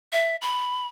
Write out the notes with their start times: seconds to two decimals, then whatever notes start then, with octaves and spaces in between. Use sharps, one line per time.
0.13 E5
0.42 B5